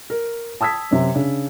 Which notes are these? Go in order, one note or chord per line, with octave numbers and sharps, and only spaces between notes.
A#4
A5 D#6 E6 G#6 B6
F#2 C3
C#3 D4